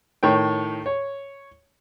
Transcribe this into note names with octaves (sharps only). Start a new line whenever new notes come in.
A2 D#3 C#5 G5
C#5